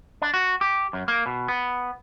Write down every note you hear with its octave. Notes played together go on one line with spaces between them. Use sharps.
D4
F#4
G4
F#2
A#3
B2
B3